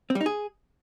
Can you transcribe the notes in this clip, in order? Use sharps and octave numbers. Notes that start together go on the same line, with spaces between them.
C4
G3
D#4
G#4